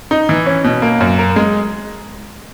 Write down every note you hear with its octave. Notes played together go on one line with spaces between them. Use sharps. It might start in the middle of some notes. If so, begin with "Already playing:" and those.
D#4
E3
C#4
B2
A#3
F#2
A#4
G#3